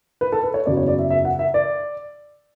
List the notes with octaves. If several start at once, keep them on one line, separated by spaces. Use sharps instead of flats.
B4
A4
B4
C#5
F#1 E2 C#3 F#3 D5
C#5
D5
E5
E5
F#5
E5
D5